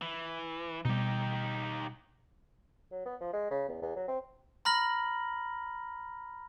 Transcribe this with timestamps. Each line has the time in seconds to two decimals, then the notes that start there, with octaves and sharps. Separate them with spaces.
0.02 E3
0.85 B2 G3 D#4 G4
2.91 F#3
3.06 B3
3.21 F3
3.33 G#3
3.51 C#3
3.69 E2
3.82 E2
3.96 F#3
4.08 C4
4.65 A#5 B5 F6 A#6 F#7